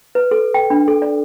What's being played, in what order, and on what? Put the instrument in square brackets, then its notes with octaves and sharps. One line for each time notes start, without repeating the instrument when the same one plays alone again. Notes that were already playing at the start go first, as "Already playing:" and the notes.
[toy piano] B4
A4
G5
D4
A4
D5